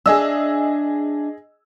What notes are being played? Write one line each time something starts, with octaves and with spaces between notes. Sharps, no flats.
D4 G#4 D#5 E5 E6